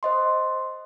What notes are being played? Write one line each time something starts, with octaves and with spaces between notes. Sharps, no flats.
C5 D#5 C6